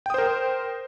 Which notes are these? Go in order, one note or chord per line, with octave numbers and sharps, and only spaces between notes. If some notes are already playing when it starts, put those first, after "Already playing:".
A#4 C5 G5 D#6